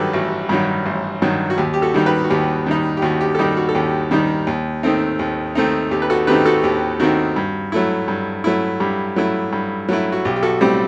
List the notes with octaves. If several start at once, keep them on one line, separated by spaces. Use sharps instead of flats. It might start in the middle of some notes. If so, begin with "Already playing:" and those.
Already playing: A1 G2 D#3 F#3 F#4 G4 A4 B4
A1 F#4
G2 D#3 F#3
A1
G2 D#3 F#3
F#4
D#2 G4
G4
F#4 A4
D#3 G3 D#4
G4 B4
F#4
D#2 G4
D#3 G3 D#4
G4
D#2 F#4
G4
A4
D#3 G3 D#4 G4
F#4
A4
D#2 G4
D#3 G3 D#4
D#2
D#3 A3 C4 D#4
D#2
D#3 A3 C4 D#4
D#2 G4
B4
F#4 A4
D#3 A3 C4 D#4 G4 B4
F#4 A4
F#4
D#2 G4
D#3 A3 C4 D#4 F#4
G2
F#3 A3 E4
G2
F#3 A3 E4
G2 G4
F#3 A3 E4
G2
F#3 A3 E4
F#4
B1 G4
G4
F#4 A4
A2 G3 C4 G4